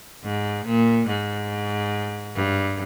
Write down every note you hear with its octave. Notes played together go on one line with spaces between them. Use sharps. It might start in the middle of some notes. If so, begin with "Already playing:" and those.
G#2
A#2
G#2
G2